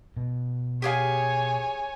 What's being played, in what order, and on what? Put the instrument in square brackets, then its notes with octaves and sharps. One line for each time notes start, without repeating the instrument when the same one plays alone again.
[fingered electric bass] B2
[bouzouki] G4 G#4 F5 [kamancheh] C#5 G#5